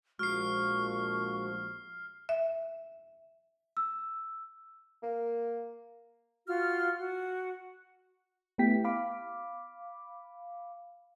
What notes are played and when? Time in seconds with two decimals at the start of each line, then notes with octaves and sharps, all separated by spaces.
0.19 A#1 A#2 F3 G#3 F#4 C#6 F6 C7
2.29 E5
3.77 E6
5.03 A#3
6.46 F4 F#4 F6
6.98 F#4
8.58 A3 B3 E4 G4 G5 B6
8.84 F5 B5 D6